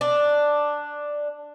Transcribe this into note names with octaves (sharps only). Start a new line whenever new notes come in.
D4